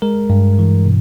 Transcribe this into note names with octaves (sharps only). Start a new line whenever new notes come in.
G#3 A#4
G2
E3
B2